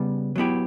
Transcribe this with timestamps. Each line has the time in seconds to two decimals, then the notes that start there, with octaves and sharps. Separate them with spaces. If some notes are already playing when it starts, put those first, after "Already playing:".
Already playing: C#3 G3 B3
0.36 F#3 B3 E4 G4